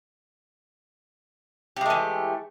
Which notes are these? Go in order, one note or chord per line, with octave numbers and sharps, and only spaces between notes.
E3 G#3 A3 G4